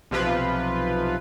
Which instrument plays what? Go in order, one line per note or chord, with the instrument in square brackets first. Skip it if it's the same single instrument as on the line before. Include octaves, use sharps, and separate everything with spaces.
[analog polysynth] B1 C3 F3 F4 B4